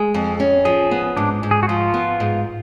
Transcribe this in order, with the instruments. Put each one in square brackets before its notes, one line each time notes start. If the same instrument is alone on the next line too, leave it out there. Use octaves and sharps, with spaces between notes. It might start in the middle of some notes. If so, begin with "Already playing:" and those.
Already playing: [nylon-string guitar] G#3 [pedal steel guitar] G#4
[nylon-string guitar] F2
C#4
[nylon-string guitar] F3 [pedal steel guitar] G#4
[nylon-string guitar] B3
[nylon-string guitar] G#2 [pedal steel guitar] D4
[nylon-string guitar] G#2
[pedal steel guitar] G#4
F#4
[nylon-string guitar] F3 [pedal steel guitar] F4
[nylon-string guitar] B3
G#2